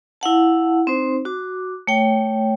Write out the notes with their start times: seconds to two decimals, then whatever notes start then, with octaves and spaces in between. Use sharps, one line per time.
0.21 E4 F5 F#5 A5
0.87 C4 D#4 C5
1.25 F#4 D6
1.87 A3 C#5 G5